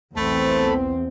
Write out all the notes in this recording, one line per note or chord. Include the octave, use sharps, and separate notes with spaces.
B1 E2 A3 C4 A4 B5